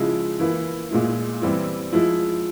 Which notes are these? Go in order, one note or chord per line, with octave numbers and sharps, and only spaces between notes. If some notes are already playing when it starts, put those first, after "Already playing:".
Already playing: C#3 F3 G#3 E4
E3 A#3 E4
A#2 G#3 E4
E3 G3 C4 E4
F3 G#3 E4